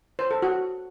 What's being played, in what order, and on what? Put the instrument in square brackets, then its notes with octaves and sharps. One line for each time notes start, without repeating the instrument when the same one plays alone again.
[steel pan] C5
A4
F#4